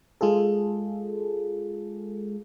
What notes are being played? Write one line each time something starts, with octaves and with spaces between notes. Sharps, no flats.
G#3 F4 G#4 A4